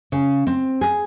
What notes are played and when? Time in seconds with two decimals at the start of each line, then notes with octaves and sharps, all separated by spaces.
0.12 C#3
0.47 C4
0.81 G#4